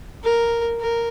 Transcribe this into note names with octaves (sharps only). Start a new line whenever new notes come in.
A#4
A#4